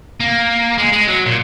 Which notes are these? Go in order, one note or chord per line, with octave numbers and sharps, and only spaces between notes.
A#3
G#3
G#3
F#3
A#2